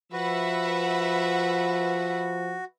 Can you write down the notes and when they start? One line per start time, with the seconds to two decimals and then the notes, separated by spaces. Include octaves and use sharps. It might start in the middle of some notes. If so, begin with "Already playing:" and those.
0.12 F3 F#4 B4 E5 F#5